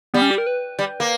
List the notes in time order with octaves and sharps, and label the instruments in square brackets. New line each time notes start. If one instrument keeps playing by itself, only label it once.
[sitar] G3 [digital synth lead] B3
[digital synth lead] C#4
G4
A#4
B4
[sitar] G3
A#3